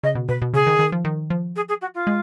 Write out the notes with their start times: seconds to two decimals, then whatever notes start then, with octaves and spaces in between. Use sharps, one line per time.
0.03 C#3 D#5
0.15 B2
0.29 B2 B4
0.42 B2
0.53 C#3 G#4
0.67 D#3
0.79 D#3
0.92 F3
1.05 D#3
1.30 F3
1.56 G#4
1.68 G#4
1.81 F#4
1.94 F4
2.07 G#3